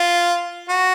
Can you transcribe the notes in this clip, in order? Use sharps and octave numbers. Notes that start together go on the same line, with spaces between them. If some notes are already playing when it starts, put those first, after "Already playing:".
Already playing: F4
F#4